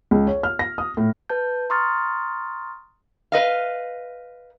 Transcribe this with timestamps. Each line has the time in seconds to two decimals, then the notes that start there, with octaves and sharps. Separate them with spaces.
0.11 C#2
0.27 C#5
0.43 F6
0.59 A#6
0.78 D#6
0.97 A2
1.29 B4 A5 G6
1.70 A#5 C6 C#6 D#6 F6 A6
3.32 B4 D#5 F5